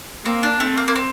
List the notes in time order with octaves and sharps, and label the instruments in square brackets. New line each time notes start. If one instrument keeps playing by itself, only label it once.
[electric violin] A#3 [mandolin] C4
[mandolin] D4
[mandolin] A3 [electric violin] C4
[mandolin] A#3
A#3
C4